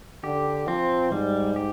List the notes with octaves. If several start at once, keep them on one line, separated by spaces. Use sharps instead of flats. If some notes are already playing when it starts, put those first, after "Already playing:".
D3 G4
F3 C4
G#2 G3
G4